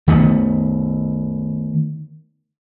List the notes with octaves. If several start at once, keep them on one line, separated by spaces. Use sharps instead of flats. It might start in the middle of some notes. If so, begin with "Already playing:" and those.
D#3 A3 B3